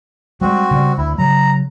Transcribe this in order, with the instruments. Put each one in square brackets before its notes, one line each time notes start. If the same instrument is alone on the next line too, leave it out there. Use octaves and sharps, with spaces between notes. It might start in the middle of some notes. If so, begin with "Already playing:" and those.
[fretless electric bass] G3 G#3 [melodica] C4 F#4
[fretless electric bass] C#3 G3
[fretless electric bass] D2 [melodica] E4
[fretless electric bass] C#3 F#3 [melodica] A#5